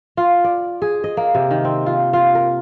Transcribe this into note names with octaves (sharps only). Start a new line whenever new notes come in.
F4
D5
G#4
D#5
A#3
C3
D#3
C4
F4
F4
A#4